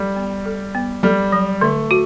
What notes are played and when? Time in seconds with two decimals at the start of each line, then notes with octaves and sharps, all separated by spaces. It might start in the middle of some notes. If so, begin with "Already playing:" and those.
Already playing: G3 A4
0.16 B3
0.46 A4
0.75 B3
1.03 G3 A4
1.32 F#3
1.61 D3 A3
1.91 F#4